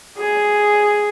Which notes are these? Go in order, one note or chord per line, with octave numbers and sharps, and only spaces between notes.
G#4